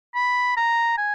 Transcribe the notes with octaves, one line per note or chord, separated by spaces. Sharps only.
B5
A#5
G#5